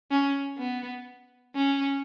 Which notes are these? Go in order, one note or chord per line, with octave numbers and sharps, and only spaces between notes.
C#4
B3
C#4